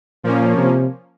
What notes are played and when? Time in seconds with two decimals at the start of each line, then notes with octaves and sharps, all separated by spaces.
0.24 A#2 F3 A#3 C#4
0.57 C3